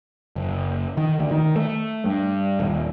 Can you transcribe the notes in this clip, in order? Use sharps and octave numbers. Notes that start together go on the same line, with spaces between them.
F#1
D#3
D2
D#3
A3
G2
D#1